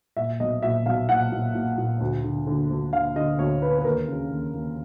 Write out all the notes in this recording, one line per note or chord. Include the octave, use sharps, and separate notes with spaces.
A#2 E5
B1 D#5
A#2 E5
B1 F5
A#2 F#5
A#2
A#2
A#2
D2
D3
D3
D2
D3 F5
D3 D#5
D2 C#5
D3 B4
B4
D#2 A#4
C#3
D#2
D#2